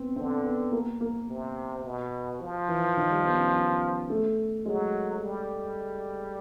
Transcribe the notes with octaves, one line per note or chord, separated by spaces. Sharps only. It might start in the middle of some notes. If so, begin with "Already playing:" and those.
Already playing: B3 C4
D3 C4
B3
A#3
A#3
C3
B2
F3
E3
D#3
G3
B3
C#4
C#4
A3
F#3 G#3
G3